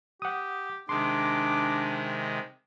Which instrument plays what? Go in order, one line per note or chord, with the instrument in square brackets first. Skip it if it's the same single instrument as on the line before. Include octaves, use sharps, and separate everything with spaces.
[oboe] G4 [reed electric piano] F#5 D#6
[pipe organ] C3 D#3 G#3 [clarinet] D4 [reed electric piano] C6 [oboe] D6